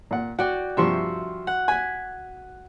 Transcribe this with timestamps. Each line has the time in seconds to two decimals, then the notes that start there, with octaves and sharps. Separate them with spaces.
0.11 A#2 F#5
0.39 F#4 D5 F#5 G5
0.77 G2 C3 F3 E5 C6 C#6
1.47 F#5
1.68 G#5 G#6 B6